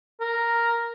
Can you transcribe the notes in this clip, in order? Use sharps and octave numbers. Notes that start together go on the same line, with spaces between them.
A#4